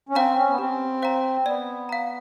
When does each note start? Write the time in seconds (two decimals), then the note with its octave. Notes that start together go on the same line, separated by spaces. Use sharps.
0.09 C#4
0.15 C4 C5 F5 A#5
0.36 C#4
0.50 B3
0.58 C4 G4
1.02 C5 F5 A#5
1.45 B3 D5
1.89 F5 A#5